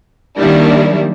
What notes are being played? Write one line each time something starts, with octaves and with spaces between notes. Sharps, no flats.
D#3 F#3 G3 A#3 D4 E4